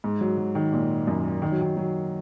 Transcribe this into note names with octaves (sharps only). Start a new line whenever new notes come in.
G#2
F#3
F#3
D#3
A#2
F#2
D#3
F#3
D#3
F#3